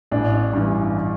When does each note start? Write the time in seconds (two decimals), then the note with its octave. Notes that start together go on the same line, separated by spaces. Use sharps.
0.11 A1 D4
0.53 G2 E3